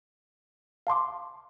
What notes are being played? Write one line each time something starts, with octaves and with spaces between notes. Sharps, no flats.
F5 A5 C6 D6